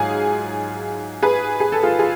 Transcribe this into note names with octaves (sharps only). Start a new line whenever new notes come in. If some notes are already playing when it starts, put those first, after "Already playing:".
Already playing: G#2 F#3 F4 G#4
G#4 B4
G#4
A4
F4 G#4
F4 G#4